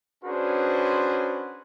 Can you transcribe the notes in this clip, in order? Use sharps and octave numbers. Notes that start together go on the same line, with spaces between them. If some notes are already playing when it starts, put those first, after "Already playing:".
C#4 D4 F#4 G#4 B4 C5